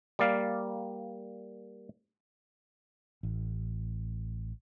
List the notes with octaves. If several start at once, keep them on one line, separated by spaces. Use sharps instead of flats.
G3 A#3 D5 F5
A1